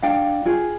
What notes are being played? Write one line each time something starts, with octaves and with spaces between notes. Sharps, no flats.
D4 F5 G5
F4 G#4